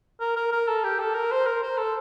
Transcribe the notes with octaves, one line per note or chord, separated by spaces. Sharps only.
A#4
A#4
A#4
A4
G4
A4
A#4
C5
A#4
C5
A4